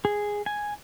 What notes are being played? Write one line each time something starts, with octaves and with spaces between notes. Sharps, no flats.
G#4
G#5